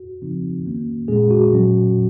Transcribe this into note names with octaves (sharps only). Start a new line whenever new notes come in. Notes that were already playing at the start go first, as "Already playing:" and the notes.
Already playing: F#4
C#3 F3 C4 D#4
D#3 A#3 C#4
A#2 G#3 C#4 G#4
F#4
A#2 F#3 C#4